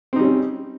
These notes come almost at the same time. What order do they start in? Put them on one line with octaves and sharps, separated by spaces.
C4 D#4 G3 C#4